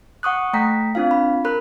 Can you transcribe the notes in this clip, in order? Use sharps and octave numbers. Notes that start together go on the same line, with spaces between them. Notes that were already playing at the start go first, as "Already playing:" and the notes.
F#5 C#6 D#6 F#6
A3 G5 A#5 B6
C4 D4 F4 F5
B5
A#4 B5 F#6